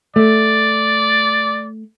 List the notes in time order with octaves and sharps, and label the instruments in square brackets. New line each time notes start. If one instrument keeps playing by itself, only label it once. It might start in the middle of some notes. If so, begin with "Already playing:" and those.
[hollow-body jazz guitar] A3 [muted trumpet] D5